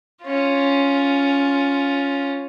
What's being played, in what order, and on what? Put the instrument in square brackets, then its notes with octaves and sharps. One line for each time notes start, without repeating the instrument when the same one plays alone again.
[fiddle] C#4 F4